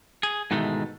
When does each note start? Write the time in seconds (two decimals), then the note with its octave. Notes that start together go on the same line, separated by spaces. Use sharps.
0.23 G#4
0.51 G#2 B2 D#3 E3 G#3 A3